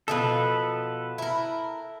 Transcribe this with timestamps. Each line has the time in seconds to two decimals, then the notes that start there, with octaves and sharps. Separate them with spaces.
0.08 B2 E3 F3 A4 B4
1.18 E4 A#4